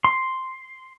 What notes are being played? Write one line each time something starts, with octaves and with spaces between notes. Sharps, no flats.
C6